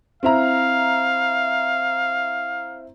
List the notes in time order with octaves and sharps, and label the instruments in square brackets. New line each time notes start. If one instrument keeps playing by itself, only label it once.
[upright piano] C4 E4 A#5 [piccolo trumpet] F5